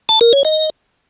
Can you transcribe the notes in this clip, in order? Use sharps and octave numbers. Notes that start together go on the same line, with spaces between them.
A5
A#4
C#5
D#5